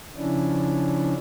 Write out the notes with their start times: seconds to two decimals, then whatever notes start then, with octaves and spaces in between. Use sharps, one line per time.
0.16 C#3 F3 C#4 D4 E4